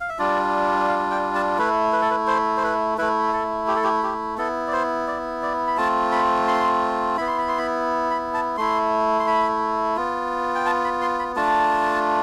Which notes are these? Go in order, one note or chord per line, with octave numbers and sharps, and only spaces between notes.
F5
E5
G3 D4 F4 D5
F5
G5
A5
A3 E4 B4
B4
A4
B4
C5
C5
B4
A3 E4 B4
A4
G4
A4
G4
G4
B3 E4 A4
D5
C5
D5
D5
B5
A3 C4 F4 A5
B5
C6
B3 E4 B5
C6
B5
C6
B5
B5
A5
A3 E4 C6
C6
B5
B3 F4
G5
A5
B5
C6
B5
A3 D4 F4 A5